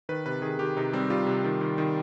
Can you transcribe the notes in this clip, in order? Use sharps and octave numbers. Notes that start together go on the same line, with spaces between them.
D#3 B4
C3 B4
D#3 G#4
D#3 G4
C3 D#4
G3 C4
G3 F4
C3
D#3
D#3
D#3